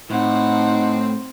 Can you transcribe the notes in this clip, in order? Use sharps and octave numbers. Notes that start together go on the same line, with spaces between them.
A2 C4 D#4 F#5